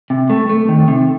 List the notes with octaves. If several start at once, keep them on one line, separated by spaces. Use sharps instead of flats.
C3
A3
A3
D#3
C3